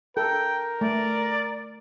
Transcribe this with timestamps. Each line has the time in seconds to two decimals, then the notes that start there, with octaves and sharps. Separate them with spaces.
0.17 A4 A#4 G5
0.81 A3 D5